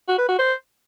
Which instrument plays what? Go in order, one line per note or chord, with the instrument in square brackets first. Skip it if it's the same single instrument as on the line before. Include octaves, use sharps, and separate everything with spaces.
[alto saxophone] F#4
B4
F#4
C5